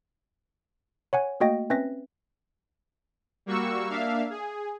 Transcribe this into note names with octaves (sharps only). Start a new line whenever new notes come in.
C#5 F#5 G#5
A3 A#3 F#4 D#5 G5 A#6
C4 C#4 B4 E5 A#6
G3 A#3 F#4 C#6 E6
A#3 D4 E5 F5
G#4